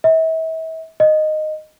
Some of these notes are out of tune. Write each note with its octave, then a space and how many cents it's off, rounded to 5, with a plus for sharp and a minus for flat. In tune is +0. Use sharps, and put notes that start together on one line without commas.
E5 -40
D#5 -10